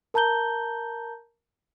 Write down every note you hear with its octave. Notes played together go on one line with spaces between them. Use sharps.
A#4 A5 A#5 G6 G7